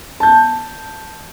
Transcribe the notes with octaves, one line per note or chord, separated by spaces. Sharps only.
A5 G6